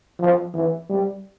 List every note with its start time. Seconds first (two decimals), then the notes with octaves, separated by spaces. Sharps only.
0.20 F3
0.54 E3
0.89 G3